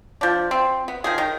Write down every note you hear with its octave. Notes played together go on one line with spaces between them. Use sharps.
F3 D4
C4
B3
D#3 F3 G#4
D#3